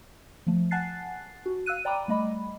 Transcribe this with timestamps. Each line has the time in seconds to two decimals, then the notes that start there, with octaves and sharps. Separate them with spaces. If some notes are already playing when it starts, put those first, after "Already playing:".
0.47 F3 A3
0.71 F#5 G#5 A5 F#6 A6 C7
1.46 F#4
1.66 F5 E6 F#6 D#7
1.85 D5 G5 A#5 B5 D6
2.08 G3 A3 D#5 B5